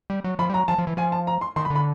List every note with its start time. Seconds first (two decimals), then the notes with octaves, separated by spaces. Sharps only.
0.10 G3
0.24 F#3
0.39 F3 B5
0.50 G3
0.53 F#3 A#5
0.68 F3 A5
0.78 F3
0.87 E3
0.97 F3 G#5
1.12 A5
1.27 A#5
1.41 C6
1.56 D#3 C6
1.65 B5
1.70 D3
1.75 B5